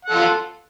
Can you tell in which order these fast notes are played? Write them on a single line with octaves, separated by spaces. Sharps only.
F#5 A4 F4